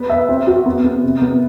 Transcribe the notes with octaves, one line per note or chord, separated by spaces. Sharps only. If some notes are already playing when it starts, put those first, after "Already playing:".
Already playing: B3 B4
E5
C4
F#4
B3
B3
C3
B3